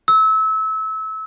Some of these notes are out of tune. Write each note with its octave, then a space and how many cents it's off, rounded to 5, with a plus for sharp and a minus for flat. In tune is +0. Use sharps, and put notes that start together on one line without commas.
E6 -25